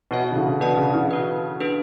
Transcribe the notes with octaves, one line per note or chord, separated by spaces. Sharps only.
B2 B3 F#4 C#5 E5
B2
D3
C#3 E3
C#3
B2 D4 F#4 B4 D5 A5
C#3
C#3 E3
C#4 F#4 B4
D4 G#4 B4